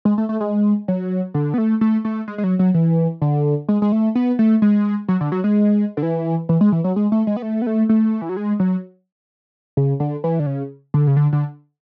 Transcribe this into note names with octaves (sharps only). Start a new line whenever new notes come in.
G#3
A3
A3
G#3
F#3
D3
B3
A3
A3
A3
G#3
G#3
F#3
F#3
E3
D3
G#3
G#3
A3
B3
A3
G#3
F#3
D3
F#3
G#3
D3
E3
E3
G#3
E3
F#3
G#3
A3
G#3
B3
A3
B3
A3
A3
E3
F#3
G#3
F#3
C#3
D3
E3
D3
C#3
D3
C#3
D3
D3